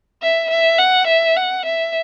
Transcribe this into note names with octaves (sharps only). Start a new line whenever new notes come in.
E5
E5
F#5
E5
F#5
E5